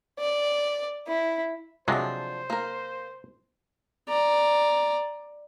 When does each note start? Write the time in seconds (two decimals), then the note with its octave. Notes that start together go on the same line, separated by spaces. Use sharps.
0.19 D5
1.07 E4
1.88 C3 F3 F#3 G#3 D4 C5
2.50 A#3 A#4
4.09 D5 A#5